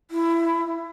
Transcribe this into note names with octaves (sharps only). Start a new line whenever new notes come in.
E4